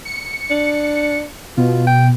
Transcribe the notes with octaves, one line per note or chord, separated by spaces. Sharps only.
C#7
D4
B2 F4
G5